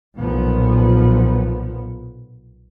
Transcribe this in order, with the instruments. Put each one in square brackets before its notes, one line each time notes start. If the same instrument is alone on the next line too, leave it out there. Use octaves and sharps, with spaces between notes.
[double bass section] B1 A#2 F3 B3